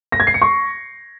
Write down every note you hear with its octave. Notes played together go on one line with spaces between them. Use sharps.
A#6
G#6
C7
C#7
C#6